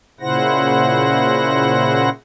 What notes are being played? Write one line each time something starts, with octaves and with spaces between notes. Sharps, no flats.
A#2 C#3 E4 C5 F#5 A#6